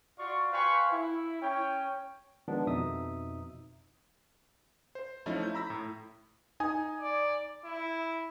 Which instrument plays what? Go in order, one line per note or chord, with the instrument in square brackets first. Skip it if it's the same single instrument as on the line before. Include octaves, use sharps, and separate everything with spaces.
[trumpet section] F4 F#4 D5 F5 C#6
B4 C5 F5 G5 G#5 C#6
E4
C#4 C#5 G5
[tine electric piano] D#3 F3 G#3 B3 D4
F2 B2 D#4 E5 D#6
[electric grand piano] C5
F3 A3 C#4 D#4 E4
E4 G6
A#5 B5 E6 A#6 B6
A2
D#4 G#5 D#6
[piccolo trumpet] D5
[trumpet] E4